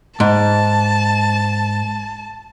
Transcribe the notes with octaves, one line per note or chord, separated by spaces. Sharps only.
G#2 A5